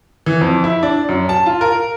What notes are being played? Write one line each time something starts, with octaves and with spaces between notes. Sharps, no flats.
E3
F2
E4
D4
F#2
A5
F4
A#4